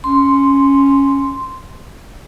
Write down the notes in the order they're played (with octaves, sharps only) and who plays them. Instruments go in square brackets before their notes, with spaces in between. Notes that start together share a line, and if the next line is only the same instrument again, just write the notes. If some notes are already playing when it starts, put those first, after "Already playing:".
[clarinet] C#4 [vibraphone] C6